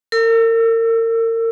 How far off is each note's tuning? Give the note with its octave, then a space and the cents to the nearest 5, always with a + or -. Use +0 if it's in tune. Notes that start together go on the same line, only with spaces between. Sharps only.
A#4 -35 E6 +20